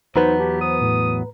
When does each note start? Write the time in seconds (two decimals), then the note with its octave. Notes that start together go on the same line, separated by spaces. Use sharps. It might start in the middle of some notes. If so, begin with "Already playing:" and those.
0.16 E2 F#3 B3 D#4 B4 C5 A#5
0.40 G4 A5
0.61 C5 D#6
0.81 A2